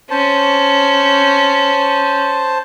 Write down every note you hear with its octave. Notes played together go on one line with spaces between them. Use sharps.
C#4 C5 A5